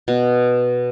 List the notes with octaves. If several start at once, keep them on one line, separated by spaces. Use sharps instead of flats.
B2